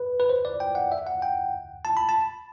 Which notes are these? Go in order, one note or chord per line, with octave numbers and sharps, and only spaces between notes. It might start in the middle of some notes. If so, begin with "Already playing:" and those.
Already playing: B4
B4
C5
D5
G5
F#5
E5
F#5
G5
A5
B5
A5